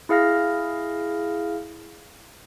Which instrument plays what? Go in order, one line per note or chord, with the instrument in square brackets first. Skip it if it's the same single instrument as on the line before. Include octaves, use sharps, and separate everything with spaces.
[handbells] E4 G#4 F5 F6 A#6